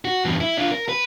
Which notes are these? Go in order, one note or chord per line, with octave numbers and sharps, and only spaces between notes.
F#4
E2 G2
E4
D4 F4
A#4
B4